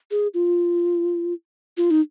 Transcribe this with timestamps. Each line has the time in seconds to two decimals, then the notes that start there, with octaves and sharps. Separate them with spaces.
0.11 G#4
0.34 F4
1.77 F4
1.91 D#4